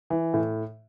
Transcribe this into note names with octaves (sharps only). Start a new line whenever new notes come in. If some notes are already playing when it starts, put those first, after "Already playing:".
E3
A2